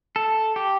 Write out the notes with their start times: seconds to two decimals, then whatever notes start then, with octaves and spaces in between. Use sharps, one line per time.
0.16 A4
0.56 G4